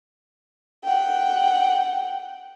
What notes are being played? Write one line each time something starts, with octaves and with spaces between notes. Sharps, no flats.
F#5 G5